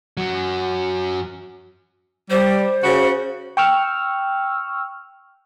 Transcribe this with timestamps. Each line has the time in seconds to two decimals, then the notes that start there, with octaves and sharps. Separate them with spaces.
0.17 F#2 F#3
2.30 G3 C5
2.83 C#3 F#4
3.57 G5 C#6 E6 F6